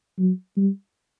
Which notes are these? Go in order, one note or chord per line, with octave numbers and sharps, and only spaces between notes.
F#3
G3